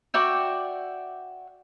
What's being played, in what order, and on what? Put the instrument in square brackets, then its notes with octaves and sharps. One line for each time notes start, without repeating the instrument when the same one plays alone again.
[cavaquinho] F#4 D5 E5 G5